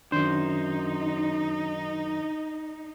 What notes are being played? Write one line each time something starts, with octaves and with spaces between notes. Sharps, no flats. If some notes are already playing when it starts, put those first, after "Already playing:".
F#2 D#3 D4 D#4 C5